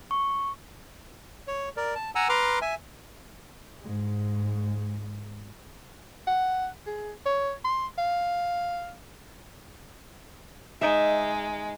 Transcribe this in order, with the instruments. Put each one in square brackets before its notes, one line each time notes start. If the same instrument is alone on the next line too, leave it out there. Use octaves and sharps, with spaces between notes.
[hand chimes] C#6
[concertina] C#5
A#4 D5
A5
F#5 G#5 A#5 E6
B4 A#5 C6 D6 F6
E5 G#5
[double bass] G#2 G#3
[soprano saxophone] F#5
G#4
C#5
C6
F5
[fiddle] G#3 [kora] D#4 E5